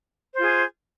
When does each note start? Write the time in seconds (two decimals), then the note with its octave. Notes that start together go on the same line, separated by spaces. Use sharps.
0.34 C5
0.38 F4
0.41 G#4